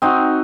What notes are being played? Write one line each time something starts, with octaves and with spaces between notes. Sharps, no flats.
C4 D#4 F#4